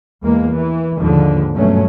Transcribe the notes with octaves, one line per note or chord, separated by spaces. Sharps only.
E2 G#3 A#3
E3
D#2 G#2 D3 F3
G1 G2 B2 F#3 A3 C#4